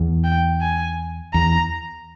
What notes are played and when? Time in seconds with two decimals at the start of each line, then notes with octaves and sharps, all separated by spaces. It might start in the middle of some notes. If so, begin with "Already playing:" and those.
Already playing: E2
0.24 G5
0.61 G#5
1.34 E2 A#5